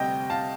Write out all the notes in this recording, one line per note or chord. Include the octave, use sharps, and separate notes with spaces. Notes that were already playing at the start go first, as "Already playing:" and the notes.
Already playing: D2 C3 G3 D#5 G5
F5 A5